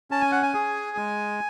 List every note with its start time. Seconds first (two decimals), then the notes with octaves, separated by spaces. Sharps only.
0.11 C#4 A5
0.21 G#5
0.32 F#5
0.43 G#5
0.54 G#4
0.97 G#3